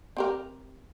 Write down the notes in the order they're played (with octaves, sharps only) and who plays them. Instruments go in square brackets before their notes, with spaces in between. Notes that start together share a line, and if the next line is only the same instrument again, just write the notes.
[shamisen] C4 G4 A#4